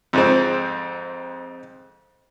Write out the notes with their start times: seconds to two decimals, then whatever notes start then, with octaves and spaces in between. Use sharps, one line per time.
0.13 F2 G#2 C4